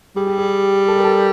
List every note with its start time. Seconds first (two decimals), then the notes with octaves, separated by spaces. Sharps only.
0.16 G3 G#4
0.27 G4
0.38 G#4
0.88 A4
0.96 A#4
1.04 A4